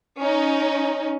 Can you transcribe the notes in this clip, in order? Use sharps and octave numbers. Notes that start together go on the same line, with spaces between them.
C#4 D#4